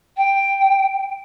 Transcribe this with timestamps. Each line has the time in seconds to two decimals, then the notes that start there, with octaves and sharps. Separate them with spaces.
0.17 G5